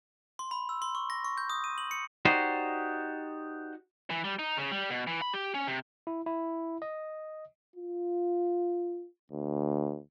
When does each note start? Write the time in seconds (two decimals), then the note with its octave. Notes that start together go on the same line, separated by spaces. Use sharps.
0.39 C6
0.51 B5
0.69 E6
0.82 C6
0.95 C#6
1.10 A#6
1.25 C#6
1.38 G6
1.50 D#6
1.64 D#7
1.78 F#7
1.91 C#7
2.25 D#4 F#4 G4 C5 D5 D#5
4.10 E3
4.24 G3
4.39 D#4
4.57 C#3
4.72 G3
4.90 B2
5.07 E3
5.22 B5
5.34 G4
5.54 C#4
5.68 C3
6.07 E4
6.26 E4
6.82 D#5
7.76 F4
9.32 D2